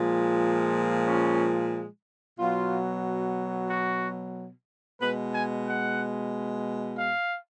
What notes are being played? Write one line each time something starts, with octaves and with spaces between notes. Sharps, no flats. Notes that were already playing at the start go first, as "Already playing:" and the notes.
Already playing: A#2 F3 G#3
C#4
B2 F#3 F4
F#4
B2 G#3 B4
G#5
F#5
F5